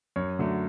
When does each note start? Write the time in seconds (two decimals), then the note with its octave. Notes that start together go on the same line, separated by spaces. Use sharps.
0.16 F#2 C#5
0.39 D3 F#3 A3